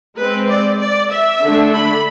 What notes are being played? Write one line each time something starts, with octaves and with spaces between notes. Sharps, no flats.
G#3 C4 B4
D5
D5
E5
D3 A3 D4
B5